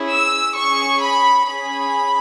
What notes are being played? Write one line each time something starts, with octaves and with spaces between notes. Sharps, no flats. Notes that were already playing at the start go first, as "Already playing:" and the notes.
Already playing: C#4 E4 G#4
E6
C#4 G#4 C#6
B5
C#4 G#4 B5